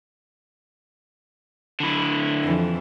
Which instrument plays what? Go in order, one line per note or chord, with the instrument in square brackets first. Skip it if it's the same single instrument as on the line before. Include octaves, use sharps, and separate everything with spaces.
[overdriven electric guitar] D3 E4
[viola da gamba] F2 E3